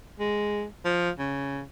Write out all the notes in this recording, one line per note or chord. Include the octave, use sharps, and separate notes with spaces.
G#3
F3
C#3